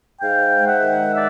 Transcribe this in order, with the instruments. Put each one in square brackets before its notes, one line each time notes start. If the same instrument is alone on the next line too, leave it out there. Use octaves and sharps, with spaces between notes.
[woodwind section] G#2 F5 G5
G#3
E5 F#5
D#3
D5 E5